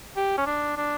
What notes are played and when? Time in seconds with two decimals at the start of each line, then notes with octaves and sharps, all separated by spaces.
0.17 G4
0.38 C#4
0.46 D4
0.77 D4